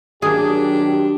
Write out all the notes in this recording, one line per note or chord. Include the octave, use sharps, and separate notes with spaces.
D#3 F#3 A#3 D4 G4 G#4